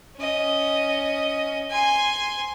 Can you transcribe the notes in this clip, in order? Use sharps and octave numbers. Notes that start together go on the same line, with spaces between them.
C#4 D#5
G#5 C6